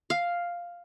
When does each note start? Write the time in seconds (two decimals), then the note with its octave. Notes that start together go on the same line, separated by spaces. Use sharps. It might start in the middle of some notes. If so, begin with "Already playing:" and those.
0.10 F5